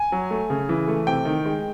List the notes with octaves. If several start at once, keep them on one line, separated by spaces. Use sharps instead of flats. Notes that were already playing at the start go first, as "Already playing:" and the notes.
Already playing: G#5
F#3
A3
C#3
E3
A3
C3 G5
D#3
G#3